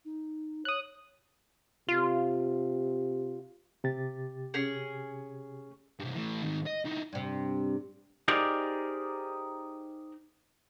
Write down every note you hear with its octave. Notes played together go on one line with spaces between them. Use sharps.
D#4
C#5 D#6 F#6
C3 F4
C3 G4 A6
C#4 G#4
G2 C3
E3 A3
G#2 D#3
D#5
E3 D#4
G2 C3
D#4 G4 G#4 A#4 C5 D5